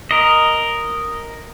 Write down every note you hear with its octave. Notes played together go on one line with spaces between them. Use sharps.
A#4 D#5